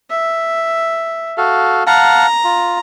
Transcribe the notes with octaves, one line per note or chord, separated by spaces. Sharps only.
E5
F#4 A4 F5
F5 F#5 A5 A#5
F4